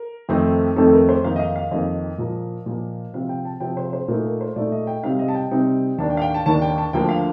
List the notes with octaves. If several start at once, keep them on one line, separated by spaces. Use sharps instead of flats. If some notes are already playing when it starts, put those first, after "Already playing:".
Already playing: A#4
F2 D#3 A3 C4 D#4
F2 D#3 A3 C4 D#4 A4
A#4
C5
F2 D#3 A#3 D#4 F5
D#5
F5
F5
F2 D#3 A#3 D#4 D#5
A#2 F3 A#3
A#2 F3 A#3
C3 F3 C4 F5
G5
A5
C3 F3 C4 G5
C5
C5
A#2 A3 D#4 A#4
A#4
C5
A#2 A3 D#4 D5
D#5
G5
C3 G3 C4 D#4 F5
D#5
A5
G5
C3 G3 C4 D#4
D#2 D#3 A#3 D4 A5
G5
F5
G5
A5
D#2 D#3 A#3 D4 A5
G5
A5
D2 D3 F3 A#3 G5
F5